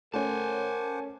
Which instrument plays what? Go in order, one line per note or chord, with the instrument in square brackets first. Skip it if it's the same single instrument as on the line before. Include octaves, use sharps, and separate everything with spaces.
[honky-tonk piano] A3 C#4 [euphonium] A#4 [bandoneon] C5 F#5 D6 [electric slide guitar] G#5 A5